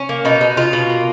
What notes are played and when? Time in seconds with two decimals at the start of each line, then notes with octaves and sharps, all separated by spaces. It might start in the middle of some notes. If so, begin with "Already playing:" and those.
Already playing: C#4
0.09 A#3
0.25 B2 D#4
0.41 B2
0.57 B2 F4
0.73 B2
0.90 A#3